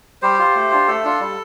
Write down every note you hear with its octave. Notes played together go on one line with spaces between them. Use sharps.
G3 G4 C5
F4
A3
D4 F4
A3 A4
D4 F4
G3